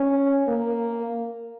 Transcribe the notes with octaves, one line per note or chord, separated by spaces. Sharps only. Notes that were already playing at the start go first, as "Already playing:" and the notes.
Already playing: C#4
A#3